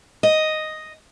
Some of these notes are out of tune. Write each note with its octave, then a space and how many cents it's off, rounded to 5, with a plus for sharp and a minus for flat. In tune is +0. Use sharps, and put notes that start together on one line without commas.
D#5 +0